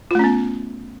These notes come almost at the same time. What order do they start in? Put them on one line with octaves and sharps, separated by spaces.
F4 A3 C#4 B3